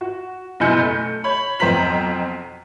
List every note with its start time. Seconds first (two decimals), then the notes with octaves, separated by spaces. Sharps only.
0.01 F#4
0.60 F#1 B2 E4 G#5 G6 C#7
0.83 A3
1.24 C#5 B5
1.59 B1 F2 C5 A#5 B6 F#7